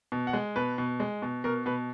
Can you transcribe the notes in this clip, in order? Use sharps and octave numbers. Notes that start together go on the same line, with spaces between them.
B2
F#5
G#3
B2 B4
B2
G#3
B2
B2 A#4
B2 B4